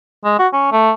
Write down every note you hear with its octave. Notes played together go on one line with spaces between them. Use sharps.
G#3
F#4
C#4
A3